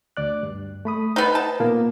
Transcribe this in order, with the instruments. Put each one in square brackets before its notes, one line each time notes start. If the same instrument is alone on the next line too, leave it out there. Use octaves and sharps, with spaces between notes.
[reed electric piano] D2 D5 F#6
G2
A3 B5 D#6
[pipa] B3 D#4 [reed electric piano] C5
[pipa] A5
[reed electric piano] A#2 A#3 B3